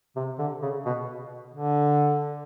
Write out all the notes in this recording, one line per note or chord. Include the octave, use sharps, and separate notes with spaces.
C3
D3
C#3
B2
D3